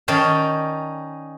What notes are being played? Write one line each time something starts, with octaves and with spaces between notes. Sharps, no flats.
D#3 C#4 D#4 D5 G5 A5